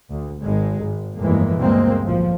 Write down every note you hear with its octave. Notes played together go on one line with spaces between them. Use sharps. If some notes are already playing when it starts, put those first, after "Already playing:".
D2
G#1 G#3
G#1
G1 F2 A2 E3 G#3 A#3
G1 D2 B2 G#3 A#3 C4
B1 A2 F3